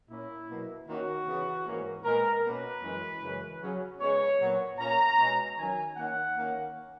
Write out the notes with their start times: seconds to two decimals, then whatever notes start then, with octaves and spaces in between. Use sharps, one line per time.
0.08 A#2 A#3 C#4 E4
0.48 B2 F#3 A#3
0.86 D#3 A#3 C#4 F#4
1.27 C#3 E3 B3
1.66 G#2 E3 A#3 C#4
2.04 A#2 G#3 B3 A#4
2.44 B2 A#3 C#4 B4
2.82 F#2 E3 G#3 C#4
3.21 F#2 C#3 E3 G#3 C#4
3.61 C#3 F#3 C#4
4.00 C#3 G#3 B3 C#5
4.39 A#2 F#3 B3
4.78 A#2 A#3 C#4 A#5
5.17 B2 G#3 C#4
5.57 D#3 F#3 C#4 G#5
5.96 D#3 A#3 C#4 F#5
6.35 D#3 A#3 C#4